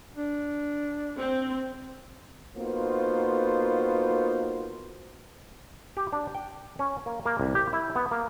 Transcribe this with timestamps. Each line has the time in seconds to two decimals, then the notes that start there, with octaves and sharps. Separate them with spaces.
0.16 D4
1.17 C4
2.56 A#3 B3 D#4 F4 F#4 C5
5.97 G4
6.13 D4
6.35 G5
6.79 C#4
7.06 A#3
7.26 A#3
7.40 C2
7.55 G4
7.73 E4
7.95 B3
8.11 A#3